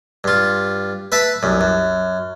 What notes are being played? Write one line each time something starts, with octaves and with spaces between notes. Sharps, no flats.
G2 F4
B4 E5 A5 B5
C2 F#2
F#2